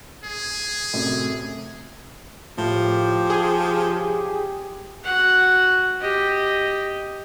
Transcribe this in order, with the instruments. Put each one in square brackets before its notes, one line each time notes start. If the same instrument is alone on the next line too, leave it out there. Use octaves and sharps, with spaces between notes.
[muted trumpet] G#4
[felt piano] F#2 A2 C3
[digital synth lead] A2 [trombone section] C#3 G4 [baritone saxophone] F3
[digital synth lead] G#4
[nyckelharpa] F#4 F#5
G4 D#5